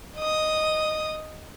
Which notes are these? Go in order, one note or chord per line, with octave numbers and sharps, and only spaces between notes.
D#5 D#6